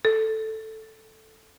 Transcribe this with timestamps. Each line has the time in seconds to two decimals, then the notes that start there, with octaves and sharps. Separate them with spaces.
0.05 A4